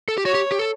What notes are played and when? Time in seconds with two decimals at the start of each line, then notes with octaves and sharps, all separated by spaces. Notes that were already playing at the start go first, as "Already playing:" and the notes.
0.08 A4
0.18 G4
0.25 F#4 C#5
0.35 G4
0.52 G4
0.59 A4